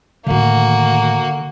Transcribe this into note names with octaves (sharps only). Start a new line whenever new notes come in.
A2 D3 D#3 A#3 F#4